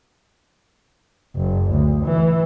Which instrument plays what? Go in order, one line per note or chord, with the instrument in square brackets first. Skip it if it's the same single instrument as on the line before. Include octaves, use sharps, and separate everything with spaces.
[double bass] F#1
D2
E3